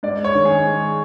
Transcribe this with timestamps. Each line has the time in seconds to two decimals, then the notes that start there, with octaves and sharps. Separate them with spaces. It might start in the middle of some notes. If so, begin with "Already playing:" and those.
0.03 G#2 D5
0.24 C#5
0.35 D#3
0.45 G#4
0.66 G#3